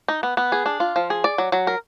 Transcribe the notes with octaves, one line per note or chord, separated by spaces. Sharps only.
D#4
B3
B3
G#4
D4
F4
F3
G#4
D5
F#3
F#3
A#4